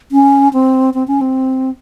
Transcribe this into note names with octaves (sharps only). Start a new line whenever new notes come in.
C#4
C4
C4
C#4
C4